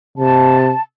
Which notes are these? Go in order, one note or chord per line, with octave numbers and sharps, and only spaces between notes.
C3 A5